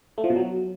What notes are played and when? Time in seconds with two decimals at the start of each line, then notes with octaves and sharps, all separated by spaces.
0.18 A3
0.24 F3
0.30 B2
0.36 F#3